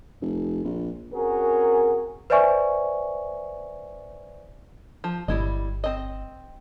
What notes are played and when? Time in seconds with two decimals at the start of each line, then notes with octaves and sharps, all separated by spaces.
0.22 F1
0.64 A#1
1.14 C4 C#4 F#4 G#4 A#4
2.30 B4 C5 D5 E5 G#5 C#6
5.04 F3
5.28 G1 G3 E4 D#5
5.84 C4 D#5